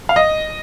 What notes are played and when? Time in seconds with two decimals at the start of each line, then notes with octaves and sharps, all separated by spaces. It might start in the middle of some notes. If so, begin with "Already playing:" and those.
0.09 F5
0.16 D#5